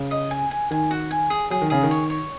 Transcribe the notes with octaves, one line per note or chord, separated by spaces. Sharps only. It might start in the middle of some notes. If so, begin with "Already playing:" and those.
Already playing: C#3
D#5
G#5
G#5
D#3 G#5
F#4
G#5
G#4
F#3 G#4
D#3
C#3 G#4
D#3
C#5
C#5